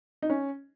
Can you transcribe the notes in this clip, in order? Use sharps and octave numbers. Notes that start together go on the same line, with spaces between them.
D#4
C#4